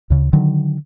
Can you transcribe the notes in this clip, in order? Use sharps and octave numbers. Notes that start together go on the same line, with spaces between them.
D2 C#3
D3 D#3 F#3